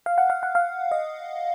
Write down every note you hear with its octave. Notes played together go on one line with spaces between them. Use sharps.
F5
F#5
F5
F#5
F5
D#5